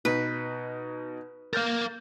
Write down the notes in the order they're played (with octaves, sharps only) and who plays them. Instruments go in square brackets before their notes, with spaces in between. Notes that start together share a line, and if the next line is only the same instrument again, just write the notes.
[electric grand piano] B2 D#4 [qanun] B4
[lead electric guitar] A#4 F5 [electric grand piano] F6 G6 A6